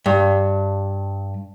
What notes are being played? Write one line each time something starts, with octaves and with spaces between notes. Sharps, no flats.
G2